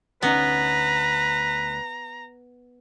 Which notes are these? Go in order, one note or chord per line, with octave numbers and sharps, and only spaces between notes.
D2 B3 C#4 D#4 B4 A#5